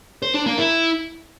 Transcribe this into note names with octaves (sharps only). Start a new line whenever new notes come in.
C5
D4
A#3
E4